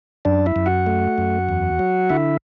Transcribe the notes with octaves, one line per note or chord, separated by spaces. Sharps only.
F#2 D4 D5
E4 E5
F#2
F#4 F#5
A3
F#2
E2
F#3
D3 E4 E5